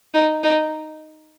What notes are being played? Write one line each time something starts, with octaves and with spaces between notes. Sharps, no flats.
D#4
D#4